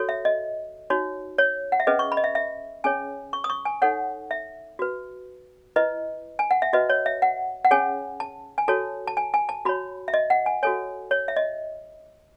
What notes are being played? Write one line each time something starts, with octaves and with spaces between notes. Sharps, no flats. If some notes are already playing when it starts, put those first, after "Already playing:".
Already playing: F#4 A4 C#5
E5
D#5
D#4 F#4 C#5
C#5
F#5
E5
C#4 G#4 B4 D#5
C#6
B5
D#5
E5
E5
C#4 G#4 C#5 G#5
C#6
D#6
C#6
G#5
D#4 A4 C#5 F#5
E5
F#4 B4
E4 B4 D#5
G#5
F#5
E5
F#4 B4 D#5
C#5
E5
F#5
F#5
C#4 G#4 C#5 G#5
A5
G#5
F#4 A4 C#5 A5
A5
G#5
G#5
A5
F#4 C#5 B5
E5
D#5
F#5
G#5
F#4 A4 C#5 G#5
C#5
E5
D#5